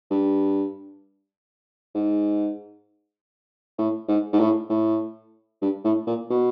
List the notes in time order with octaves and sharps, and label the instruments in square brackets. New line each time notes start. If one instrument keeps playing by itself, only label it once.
[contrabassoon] G2
G#2
A2
G#2
G#2
A2
A2
G2
A2
A#2
B2